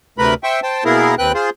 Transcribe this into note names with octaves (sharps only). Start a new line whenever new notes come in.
D2 C3 A3 A#4 B4 B5
C5 E5 G5 C#6
C5 G5 A5
B2 A#3 B3 E4 G#4 A#4
D#2 C4 B4 G5 F#6
F4 G#4 C5